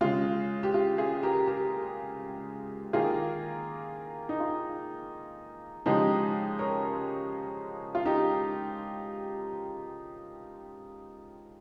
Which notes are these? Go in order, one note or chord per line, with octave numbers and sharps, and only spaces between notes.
C#3 G#3 F4
G4
F4
F4 G#4
G4 A#4
G4 A#4
D#3 A#3 F4 G#4
D#4
F4
C#3 F3 G#3 D#4 G4
A#4 C#5
F4
D#4 G4